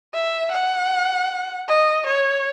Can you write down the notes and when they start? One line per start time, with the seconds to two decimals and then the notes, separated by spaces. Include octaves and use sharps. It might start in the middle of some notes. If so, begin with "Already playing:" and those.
0.14 E5
0.52 F#5
1.68 D#5
2.06 C#5